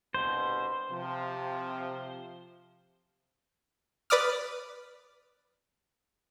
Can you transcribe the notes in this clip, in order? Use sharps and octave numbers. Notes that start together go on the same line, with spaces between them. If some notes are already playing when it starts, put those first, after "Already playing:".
C2 G2 B2 C5
C3 F3
B4 D5 D6 D#6 F6